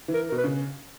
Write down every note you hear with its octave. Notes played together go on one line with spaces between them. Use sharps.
E3
A#4
B2 A#4
B4
C#3